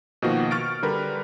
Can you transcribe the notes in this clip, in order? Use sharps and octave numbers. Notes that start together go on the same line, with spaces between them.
B2 D#3 F3 A#3 F#4
C#6 F6 A6 D7
D3 G3 A#4 B4